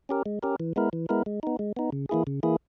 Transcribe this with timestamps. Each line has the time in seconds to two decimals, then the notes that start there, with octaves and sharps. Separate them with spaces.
0.09 C#4 G4 A#4
0.26 G#3
0.43 C#4 G4 A#4
0.60 E3
0.76 G#3 B3 E4 A#4
0.93 E3
1.09 G#3 B3 E4 A#4
1.26 G#3
1.43 B3 D#4
1.59 G#3
1.77 B3 D#4
1.92 C#3
2.09 E3 A#3 E4 G#4
2.27 C#3
2.43 E3 A#3 E4 G#4